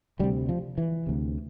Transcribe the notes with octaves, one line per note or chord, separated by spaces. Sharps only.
D2 C3 G3
F3
E3
D2 C3